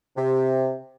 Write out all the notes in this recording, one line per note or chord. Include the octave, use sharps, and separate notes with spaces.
C3